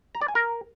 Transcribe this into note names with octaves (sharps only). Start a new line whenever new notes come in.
A#5
D5
G#5
A#4